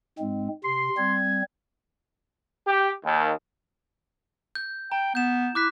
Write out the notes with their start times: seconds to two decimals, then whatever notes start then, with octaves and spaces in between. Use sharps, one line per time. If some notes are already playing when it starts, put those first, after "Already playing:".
0.19 G#2 G#3 C4
0.64 C3 C6 C7
0.97 G3 C4 G#6
2.67 G4
3.05 D#2
4.55 G6
4.92 G5 A#5
5.15 B3 G6 E7
5.55 E4 D6 F#6 B6